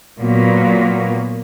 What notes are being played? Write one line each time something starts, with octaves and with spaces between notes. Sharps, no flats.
A#2 F#3 A#3 B3